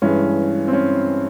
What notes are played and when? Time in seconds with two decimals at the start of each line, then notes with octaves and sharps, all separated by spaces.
0.02 G2 E3 G#3 C#4
0.68 C4
0.73 C#4